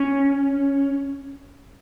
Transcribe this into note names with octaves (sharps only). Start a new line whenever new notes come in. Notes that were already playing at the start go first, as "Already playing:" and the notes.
Already playing: C#4